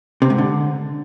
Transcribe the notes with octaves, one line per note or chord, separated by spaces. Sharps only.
C3
G#2
D3